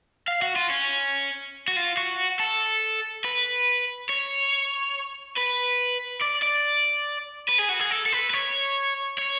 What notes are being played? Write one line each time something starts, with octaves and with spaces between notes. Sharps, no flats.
F5
F#4
F4
C#4
F#4
F4
F#4
A4
B4
C#5
B4
D5
D5
B4
G#4
F#4
G#4
A4
A4
B4
B4
C#5
C#5